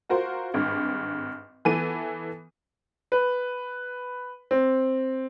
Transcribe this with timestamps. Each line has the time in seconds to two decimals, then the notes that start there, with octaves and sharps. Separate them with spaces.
0.10 F4 F#4 A#4 C5
0.54 G#1 G2
1.65 E3 B3 A4 D#7
3.12 B4
4.51 C4